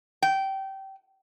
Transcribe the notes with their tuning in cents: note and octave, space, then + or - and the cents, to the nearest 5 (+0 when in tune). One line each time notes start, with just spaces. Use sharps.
G5 -20